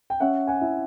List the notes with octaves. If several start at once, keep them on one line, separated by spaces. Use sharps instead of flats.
G5
C#4 E5 F#5
F#5 G#5
E4